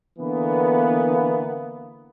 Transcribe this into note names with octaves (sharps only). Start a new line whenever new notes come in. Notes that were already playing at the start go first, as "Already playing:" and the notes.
D3 E3 A#3 B3